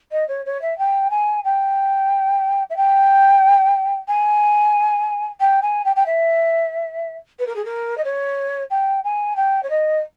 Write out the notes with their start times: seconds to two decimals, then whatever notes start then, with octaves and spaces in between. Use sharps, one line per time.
0.11 D#5
0.28 C#5
0.45 C#5
0.61 E5
0.78 G5
1.10 G#5
1.44 G5
2.69 E5
2.76 G5
4.08 G#5
5.40 G5
5.62 G#5
5.84 G5
5.96 G5
6.06 E5
7.39 B4
7.46 A#4
7.55 G#4
7.65 A#4
7.97 D#5
8.04 C#5
8.70 G5
9.04 G#5
9.36 G5
9.62 C#5
9.69 D#5